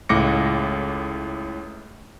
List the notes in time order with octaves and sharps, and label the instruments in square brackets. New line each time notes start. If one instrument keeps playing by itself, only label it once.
[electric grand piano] C#2 A2 D6 A#6 C#7